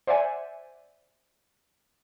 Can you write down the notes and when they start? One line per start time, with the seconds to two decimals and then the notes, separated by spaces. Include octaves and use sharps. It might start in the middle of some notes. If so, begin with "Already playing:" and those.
0.07 C5 D5 E5 F#5 G#5